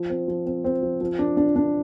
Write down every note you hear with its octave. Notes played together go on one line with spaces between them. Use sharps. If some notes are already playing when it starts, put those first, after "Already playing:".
Already playing: F3
C4
F3
C4
C4
F3
F3
D4
D4
D4